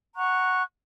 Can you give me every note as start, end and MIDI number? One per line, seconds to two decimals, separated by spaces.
0.16 0.62 78
0.16 0.62 82
0.16 0.62 85
0.16 0.62 90